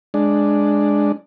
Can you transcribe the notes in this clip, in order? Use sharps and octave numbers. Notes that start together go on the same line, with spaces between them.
G#3 D4